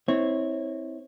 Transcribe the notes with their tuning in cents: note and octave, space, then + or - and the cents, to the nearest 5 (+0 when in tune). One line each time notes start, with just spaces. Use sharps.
C4 +0 E4 -30 C#5 -10